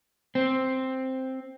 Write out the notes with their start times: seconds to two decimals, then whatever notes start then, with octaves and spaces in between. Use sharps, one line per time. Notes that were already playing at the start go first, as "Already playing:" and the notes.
0.35 C4